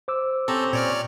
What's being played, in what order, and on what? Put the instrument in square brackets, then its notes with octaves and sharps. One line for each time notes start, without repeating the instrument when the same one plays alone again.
[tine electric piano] C5 D6 E6
[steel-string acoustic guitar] C4 [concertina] C#4 G4 A#5 [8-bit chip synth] A4
[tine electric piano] A#2 [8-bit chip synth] C#5 D5 F6